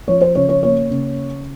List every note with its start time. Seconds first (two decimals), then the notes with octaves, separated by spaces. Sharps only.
0.08 F3 C#5
0.21 C5
0.35 C#3 C#5
0.49 C#5
0.63 A#3 C#5
0.90 C#3